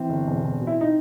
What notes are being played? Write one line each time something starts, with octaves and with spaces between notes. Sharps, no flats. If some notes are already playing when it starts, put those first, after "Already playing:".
Already playing: E3 C4
G1
E1
E1
B2
E4
D#4